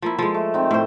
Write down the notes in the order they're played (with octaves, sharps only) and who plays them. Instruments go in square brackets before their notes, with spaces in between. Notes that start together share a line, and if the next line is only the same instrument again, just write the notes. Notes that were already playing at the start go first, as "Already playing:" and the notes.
[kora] F3 A#3 E4
[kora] F3 G#3 [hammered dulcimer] A4
[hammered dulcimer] A3
D#3 C4
[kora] A2 C5